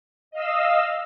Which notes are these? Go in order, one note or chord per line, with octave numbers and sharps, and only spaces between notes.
D#5 F5 E6